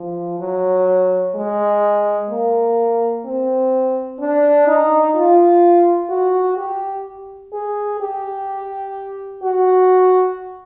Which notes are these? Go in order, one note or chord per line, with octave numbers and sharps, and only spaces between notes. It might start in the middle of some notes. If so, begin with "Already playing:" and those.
Already playing: F3
F#3
G#3
A#3
C4
D4
D#4
F4
F#4
G4
G#4
G4
F#4